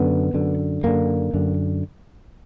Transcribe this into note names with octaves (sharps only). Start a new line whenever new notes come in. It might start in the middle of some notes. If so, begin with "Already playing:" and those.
Already playing: F#2 D3 B3
F#2 D3
F#2 D3 A#3
F#2 D3